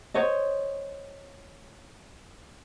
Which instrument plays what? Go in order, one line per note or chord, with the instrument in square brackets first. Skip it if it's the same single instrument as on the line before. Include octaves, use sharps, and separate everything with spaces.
[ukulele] C5 C#5 D#5